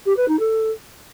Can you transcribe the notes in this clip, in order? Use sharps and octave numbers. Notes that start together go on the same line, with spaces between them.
G4
B4
D#4
A4